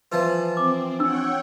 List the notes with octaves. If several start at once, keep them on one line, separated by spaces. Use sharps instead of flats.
E3 F3 F4 B4
C4 D6
D4 C#5 F#5 G5 E6